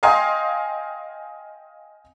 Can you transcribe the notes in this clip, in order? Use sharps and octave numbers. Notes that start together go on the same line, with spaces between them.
D#5 F5 G5 G#5 C6 D#6